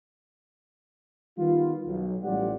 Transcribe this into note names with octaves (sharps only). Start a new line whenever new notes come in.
D#3 G3 B3 F4
B1
A1 G3 F4 G4 D5 F#5